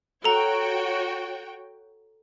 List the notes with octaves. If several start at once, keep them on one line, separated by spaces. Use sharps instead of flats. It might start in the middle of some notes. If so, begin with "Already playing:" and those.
F#4 A4 C#5 G5 A#5